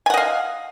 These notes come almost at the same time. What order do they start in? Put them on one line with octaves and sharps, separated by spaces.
G#5 F#5 D#5 F5